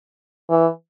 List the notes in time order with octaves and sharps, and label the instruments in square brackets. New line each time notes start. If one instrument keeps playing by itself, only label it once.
[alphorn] E3